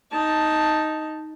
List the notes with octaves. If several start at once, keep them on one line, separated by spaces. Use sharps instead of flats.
D#4 A5